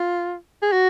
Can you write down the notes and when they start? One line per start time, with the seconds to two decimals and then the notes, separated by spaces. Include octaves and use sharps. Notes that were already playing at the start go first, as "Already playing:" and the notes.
Already playing: F4
0.62 G#4
0.72 F#4